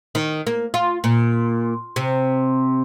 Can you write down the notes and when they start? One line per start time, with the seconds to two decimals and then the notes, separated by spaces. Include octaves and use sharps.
0.15 D#3
0.47 A#3
0.74 F4
1.04 A#2
1.96 C3